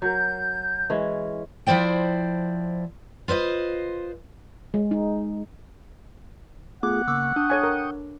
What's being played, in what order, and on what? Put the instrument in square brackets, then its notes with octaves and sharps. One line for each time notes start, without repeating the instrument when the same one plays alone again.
[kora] F#3 A#4 [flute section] G6
[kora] E3 G#3 C#4
[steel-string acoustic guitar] F3 E4 C5 D5 G5
F4 B4 C5 D#5
[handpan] G#3
D#4
[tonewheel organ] A3 F4 G#4 [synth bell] B3 D6 [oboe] F#5
[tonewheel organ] C#3 A#3 C#6 [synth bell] D6 E6
[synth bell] D4 [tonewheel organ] G5 C#6 D#6
[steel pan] A4 C#5 G#5
A#4